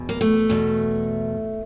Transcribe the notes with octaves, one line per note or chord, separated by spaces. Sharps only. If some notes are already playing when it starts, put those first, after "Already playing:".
Already playing: E2 B2
A#3
A3
E2 B2